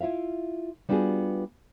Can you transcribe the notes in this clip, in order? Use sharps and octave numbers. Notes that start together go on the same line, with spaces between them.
E4 F4 E5 F5
G3 B3 D4 F4 F#4 G#4